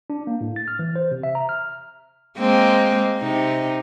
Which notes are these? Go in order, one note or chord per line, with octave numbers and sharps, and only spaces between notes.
D4
A#3
A2
A6
F6
E3
C5
C3
E5
A#5
F6
G#3 A#3 C4
C3 D#4